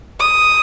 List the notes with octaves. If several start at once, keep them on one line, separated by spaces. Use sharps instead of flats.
D#6